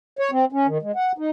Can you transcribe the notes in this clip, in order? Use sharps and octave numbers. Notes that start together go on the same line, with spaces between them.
C#5
C4
C#4
D#3
G#3
F#5
D#4